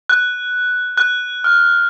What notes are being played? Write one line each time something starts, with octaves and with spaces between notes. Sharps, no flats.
F#6
F#6
F6